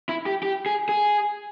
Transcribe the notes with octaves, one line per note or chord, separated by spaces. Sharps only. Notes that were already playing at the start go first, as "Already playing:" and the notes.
E4
G4
G4
G#4
G#4